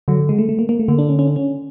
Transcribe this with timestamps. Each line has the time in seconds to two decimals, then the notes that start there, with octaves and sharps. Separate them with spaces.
0.08 D3 F#3
0.29 G#3
0.39 A3
0.49 A3
0.59 A#3
0.69 A#3
0.79 A3
0.88 D3 A#3
0.98 D4
1.09 C#4
1.19 C#4
1.28 D4
1.36 C#4